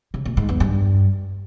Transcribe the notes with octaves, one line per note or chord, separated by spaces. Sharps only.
C#3
A#2
G#2
E2
G2